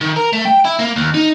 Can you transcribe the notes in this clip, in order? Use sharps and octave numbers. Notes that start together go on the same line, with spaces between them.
D#3
A#4
A3
G5
E4
A#3
D#2
D#4